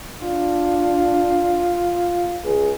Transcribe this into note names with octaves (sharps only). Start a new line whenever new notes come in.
D4 F4
C#2 G#4